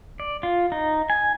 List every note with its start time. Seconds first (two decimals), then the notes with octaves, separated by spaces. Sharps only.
0.20 D5
0.43 F4
0.72 D#4
1.10 G#5